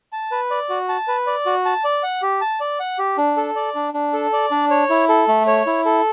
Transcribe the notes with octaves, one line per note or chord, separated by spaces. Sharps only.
A5
B4
D5
F#4
A5
B4
D5
F#4
A5
D5
F#5
G4
A5
D5
F#5
G4
D4
A4
D5
D4
D4
A4
D5
D4
C#5
E4
A4
A3
C#5
E4
A4